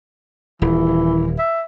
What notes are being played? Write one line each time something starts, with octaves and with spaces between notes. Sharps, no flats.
D#1 E3
E5